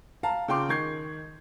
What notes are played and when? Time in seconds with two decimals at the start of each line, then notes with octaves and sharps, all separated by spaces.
0.23 F5 A5 A#5
0.48 C#3 F4 G5 C6 D6
0.69 D#3 C#6 G6 G#6 C7